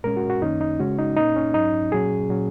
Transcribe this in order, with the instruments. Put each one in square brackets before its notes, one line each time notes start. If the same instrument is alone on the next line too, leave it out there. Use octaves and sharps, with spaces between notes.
[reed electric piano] A#2 G#3 C#4 A#4
F#4
F#4
F#2 D#3 A#3 C#4 D#4
D#4
C#3 G#3 C#4 F#4
D#4
A#2 A#3 C#4 D#4
C#4
G#2 F#3 C#4 D#4
A#2 F#3 C#4 G#4
A#2 F#3 C#4